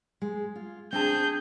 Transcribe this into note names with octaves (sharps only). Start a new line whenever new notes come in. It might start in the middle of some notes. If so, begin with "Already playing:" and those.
G#3
F4
C4 D4 G#4 A5 G6